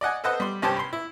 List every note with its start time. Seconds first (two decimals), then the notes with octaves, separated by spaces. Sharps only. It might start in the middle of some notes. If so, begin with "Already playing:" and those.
0.01 D5 D#5 F#5 G#5
0.24 A4 B4 C5 D#5 F#5 D#6
0.40 G3 C6
0.62 C2 G2 C#4 G4 C5 A5
0.77 B5 C6
0.93 E4